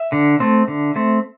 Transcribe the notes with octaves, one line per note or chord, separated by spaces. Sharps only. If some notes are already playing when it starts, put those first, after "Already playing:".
Already playing: E5
D3
A3 C4
D3
A3 C4